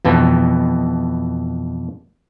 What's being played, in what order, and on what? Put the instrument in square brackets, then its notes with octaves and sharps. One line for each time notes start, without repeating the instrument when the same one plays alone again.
[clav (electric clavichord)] F2 B2 E3